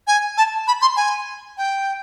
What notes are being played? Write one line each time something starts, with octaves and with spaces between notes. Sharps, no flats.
G#5
A5
B5
C6
G#5
G5